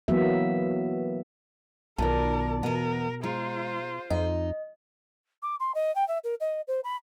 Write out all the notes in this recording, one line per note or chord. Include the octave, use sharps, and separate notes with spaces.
E3 F#3 A#3 B3 E5
B1 B2 D#3 F4 A#4 D5 A5
E2 B2 B3 A#4
G#3 F4 C5 A#5
F2 D#4 D#5
D6
C6
D#5
G5
E5
A#4
D#5
C5
B5